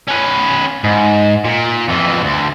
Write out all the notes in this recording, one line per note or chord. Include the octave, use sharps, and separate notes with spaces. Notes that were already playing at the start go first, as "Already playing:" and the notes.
C#4 B4
G#2
A#2
F2 E3
D2